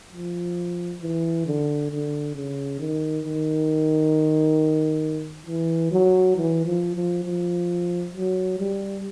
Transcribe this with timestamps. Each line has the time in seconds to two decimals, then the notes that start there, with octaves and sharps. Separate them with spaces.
0.12 F3
1.02 E3
1.46 D3
1.90 D3
2.35 C#3
2.79 D#3
3.25 D#3
5.47 E3
5.91 F#3
6.36 E3
6.66 F3
6.95 F3
7.25 F3
8.14 F#3
8.59 G3